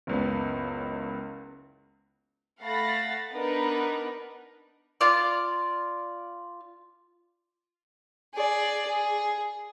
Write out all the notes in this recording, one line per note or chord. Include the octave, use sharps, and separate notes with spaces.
F#1 C#2 B3
A3 F5 F#5 B5 A6 A#6
B3 D4 D#4 A#4 B4
F4 D5
G#4 D5
G#4